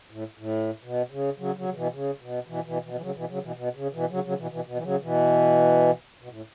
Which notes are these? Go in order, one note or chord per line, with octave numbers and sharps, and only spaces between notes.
A2
A2
B2
C#3
C#3 F#3
C#3 F#3
C#3
B2 E3
C#3
B2
B2 E3
B2 E3
B2 E3
E3
C#3 F#3
B2 E3
C#3 F#3
B2 E3
B2
C#3
B2 E3
C#3 F#3
C#3 F#3
B2 E3
B2 E3
B2
E3
C#3 F#3
B2 E3
B2
A2